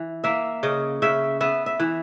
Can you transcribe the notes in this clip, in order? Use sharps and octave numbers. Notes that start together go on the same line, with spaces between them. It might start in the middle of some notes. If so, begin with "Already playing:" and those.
Already playing: E3
A#3 E5
C#3 D#5
C#3 E5
B3 E5
E5
E3